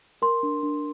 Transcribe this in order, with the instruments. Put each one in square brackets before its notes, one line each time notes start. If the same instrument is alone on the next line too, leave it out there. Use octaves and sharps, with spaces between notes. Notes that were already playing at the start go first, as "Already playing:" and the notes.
[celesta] A#4 C6
D4
D4